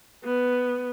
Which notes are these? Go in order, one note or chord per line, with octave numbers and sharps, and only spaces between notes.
B3